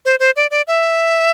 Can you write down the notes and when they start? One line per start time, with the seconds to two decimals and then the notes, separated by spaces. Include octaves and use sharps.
0.05 C5
0.20 C5
0.36 D5
0.51 D5
0.67 E5